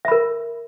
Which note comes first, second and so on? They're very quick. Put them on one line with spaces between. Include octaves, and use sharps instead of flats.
E5 B5 A#4